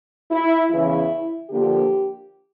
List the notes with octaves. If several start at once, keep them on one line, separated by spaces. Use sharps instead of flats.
E4
E2 C#3 E3 E4
D3 F3 A#3 D4 G4